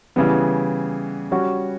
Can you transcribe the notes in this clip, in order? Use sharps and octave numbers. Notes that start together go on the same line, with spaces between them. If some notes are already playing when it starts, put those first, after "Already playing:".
C#3 E3 G3 B3
G3 C#4 F#4